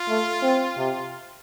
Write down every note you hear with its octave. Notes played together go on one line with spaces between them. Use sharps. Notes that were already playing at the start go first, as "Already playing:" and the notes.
Already playing: F4
A3
C4
C3